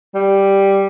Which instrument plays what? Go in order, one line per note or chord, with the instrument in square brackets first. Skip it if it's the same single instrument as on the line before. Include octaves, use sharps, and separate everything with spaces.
[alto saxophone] G3